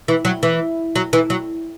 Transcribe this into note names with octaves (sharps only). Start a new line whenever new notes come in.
E3
F#3
E3
F#3
E3
F#3